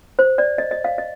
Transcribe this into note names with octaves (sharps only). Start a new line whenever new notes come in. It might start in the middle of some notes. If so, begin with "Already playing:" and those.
C5
D5
D#5
D#5
F5
D#5